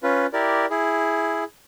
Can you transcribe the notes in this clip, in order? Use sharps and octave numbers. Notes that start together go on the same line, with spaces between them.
C#4 F4 B4
E4 G4 A#4 D5
E4 G#4